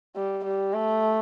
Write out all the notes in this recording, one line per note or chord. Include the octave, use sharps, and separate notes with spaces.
G3
G3
A3